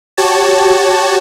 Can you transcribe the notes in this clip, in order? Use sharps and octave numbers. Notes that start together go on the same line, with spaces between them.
F#4 G4 C#5 A5